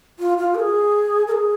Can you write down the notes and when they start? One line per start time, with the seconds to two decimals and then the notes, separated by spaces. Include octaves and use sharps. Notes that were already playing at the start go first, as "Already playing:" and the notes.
0.19 F4
0.38 F4
0.55 A#4
0.59 G#4
1.27 A#4
1.32 G#4